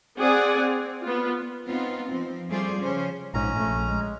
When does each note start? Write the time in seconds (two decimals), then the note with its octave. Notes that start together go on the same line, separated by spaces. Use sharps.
0.18 C4 G#4 D5 F#5 G#5
0.58 C4
1.03 B3 F4
1.68 B3 C4 D#4 F4
2.09 F3 C4
2.49 G3 A3 F4 G#4 C5 D5
2.79 C#3 F3 C#4 C5
3.34 A#1 G#2 C#4 A#5
3.55 A#1 A3
3.84 G#3